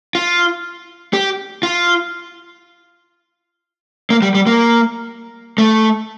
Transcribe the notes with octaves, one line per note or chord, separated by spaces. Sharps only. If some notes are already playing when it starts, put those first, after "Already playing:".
F4
G4
F4
A#3
G3
G3
A#3
A3